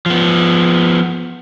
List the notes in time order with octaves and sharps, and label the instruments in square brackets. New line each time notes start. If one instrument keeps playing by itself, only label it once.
[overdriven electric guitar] F3 B3